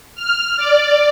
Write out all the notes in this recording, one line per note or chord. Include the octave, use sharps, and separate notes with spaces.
F6
D5